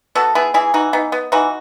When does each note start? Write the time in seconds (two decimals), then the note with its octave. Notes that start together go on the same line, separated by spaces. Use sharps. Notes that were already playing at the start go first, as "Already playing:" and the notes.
0.15 B3 F#4 A4
0.35 B3 E4 G#4
0.54 E3 E4 G#4
0.74 E3 D#4 F#4
0.93 B3 D#4
1.12 B3
1.32 E3 D#4 F#4